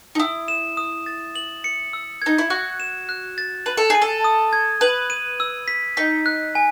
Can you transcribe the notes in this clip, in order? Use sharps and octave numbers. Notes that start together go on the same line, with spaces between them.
D#4
E4 D#6
E7
D#6
A6
F#7
C#7
E6
D#4 G#6
E4
F#4 F#6
E7
F#6
A6
B4 F#7
A4
G#4 D#7
A4
D#6
G#6
B4 F#7
D#7
E6
B6
D#4 B6
F#6
G#5